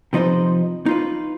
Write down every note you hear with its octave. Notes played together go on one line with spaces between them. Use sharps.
C3 F3 D#4 B4 C5
D#4 F4 B4